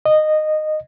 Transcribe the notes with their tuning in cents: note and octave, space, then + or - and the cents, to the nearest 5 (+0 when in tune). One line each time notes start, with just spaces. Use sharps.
D#5 -15